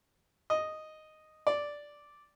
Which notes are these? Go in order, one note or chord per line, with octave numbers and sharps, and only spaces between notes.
D#5
D5